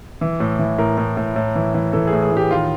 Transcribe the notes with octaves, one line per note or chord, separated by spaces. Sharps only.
E3
A2
E3
A2 A#4
A2
A2
A2
E3
E3
E3 A4
G#4
A2
G#4
A2 G4
D#3 F4